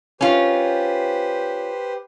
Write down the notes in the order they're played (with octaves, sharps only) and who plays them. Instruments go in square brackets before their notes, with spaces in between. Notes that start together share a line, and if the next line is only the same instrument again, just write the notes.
[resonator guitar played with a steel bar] C#4 F4 [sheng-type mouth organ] G4 B4 C5